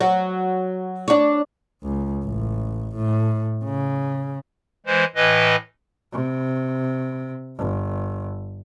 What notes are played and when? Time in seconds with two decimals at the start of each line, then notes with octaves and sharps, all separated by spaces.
0.01 F#3
1.08 D4 C#5
1.83 C#2
2.25 A1
2.96 A2
3.65 C#3
4.86 E3 G#3 C5
5.16 A2 E3 B4 D#5
6.12 C3
7.58 G1